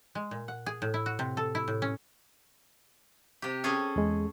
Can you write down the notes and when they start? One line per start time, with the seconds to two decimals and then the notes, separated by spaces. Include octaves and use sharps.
0.15 G#3
0.31 A#2
0.48 F#5
0.66 G#4
0.82 A2
0.94 E4
1.06 F#4
1.19 C3
1.37 A4
1.55 E4
1.68 A2
1.82 C#4
3.42 C3 G4
3.64 C#4 G#4 A4
3.96 E2 G#3